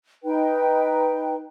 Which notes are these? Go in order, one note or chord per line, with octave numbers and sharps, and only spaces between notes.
D#4 B4 G5